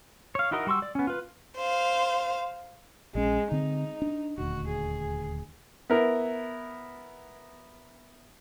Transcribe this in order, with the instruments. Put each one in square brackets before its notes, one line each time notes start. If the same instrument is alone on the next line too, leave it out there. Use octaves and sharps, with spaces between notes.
[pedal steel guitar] C#5 F5
D#4 E4 F#4 A#4 D#5
G3 F#4 C6 C#6 E6
D5
B3 C#4
F4 B4
[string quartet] C5 F5
[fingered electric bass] A#1 C#4 [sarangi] G#3
[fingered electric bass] D3 C4 [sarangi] D#4
[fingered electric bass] D4
[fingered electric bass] D#1 D2 [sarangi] F#4
[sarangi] G#4
[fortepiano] B3 E4 A#4